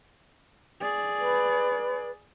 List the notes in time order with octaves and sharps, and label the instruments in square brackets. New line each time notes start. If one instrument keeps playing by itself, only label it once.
[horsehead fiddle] G#4 D5
[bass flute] B4